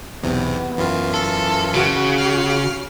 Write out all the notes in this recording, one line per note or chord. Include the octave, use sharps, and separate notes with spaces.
B1 E2 C3 B3
F#2 E3 F4
A4
C#3 F#4
F6 C7